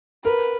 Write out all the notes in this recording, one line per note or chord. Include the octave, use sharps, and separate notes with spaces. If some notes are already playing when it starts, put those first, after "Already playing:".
A#4 B4